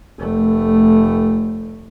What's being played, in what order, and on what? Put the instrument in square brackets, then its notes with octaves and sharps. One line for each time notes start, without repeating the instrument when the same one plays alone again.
[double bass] F1 A3